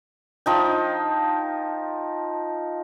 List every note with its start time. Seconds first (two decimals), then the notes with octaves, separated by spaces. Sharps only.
0.46 F3 D#4 G5